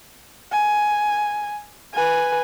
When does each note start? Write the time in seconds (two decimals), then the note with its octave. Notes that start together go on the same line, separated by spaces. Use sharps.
0.52 G#5
1.93 B4 G#5